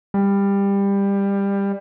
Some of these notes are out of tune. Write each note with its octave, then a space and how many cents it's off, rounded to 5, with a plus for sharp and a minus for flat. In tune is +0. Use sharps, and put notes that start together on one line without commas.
G3 +20